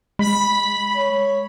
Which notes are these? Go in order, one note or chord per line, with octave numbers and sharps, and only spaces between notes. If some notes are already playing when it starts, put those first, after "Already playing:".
G#3 B5
C#5